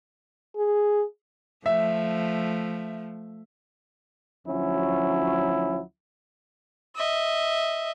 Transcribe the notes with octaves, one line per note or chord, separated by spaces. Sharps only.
G#4
F3 A3 E5
D2 F3 F#3 C#4 E4
D#5 E5